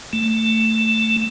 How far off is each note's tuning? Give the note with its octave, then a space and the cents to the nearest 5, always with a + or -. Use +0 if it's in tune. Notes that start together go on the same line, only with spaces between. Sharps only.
A3 +15